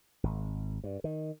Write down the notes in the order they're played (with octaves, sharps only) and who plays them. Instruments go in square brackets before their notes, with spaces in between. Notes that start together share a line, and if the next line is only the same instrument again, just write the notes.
[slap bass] G#1
G2
D#3